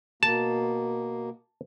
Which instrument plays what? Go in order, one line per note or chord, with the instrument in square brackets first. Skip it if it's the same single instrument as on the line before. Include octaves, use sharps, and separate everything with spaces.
[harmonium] B2 A#3 [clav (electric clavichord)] A5